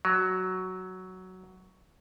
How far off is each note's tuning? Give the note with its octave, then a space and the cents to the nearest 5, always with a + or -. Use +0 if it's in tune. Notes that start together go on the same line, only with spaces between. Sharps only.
F#3 +5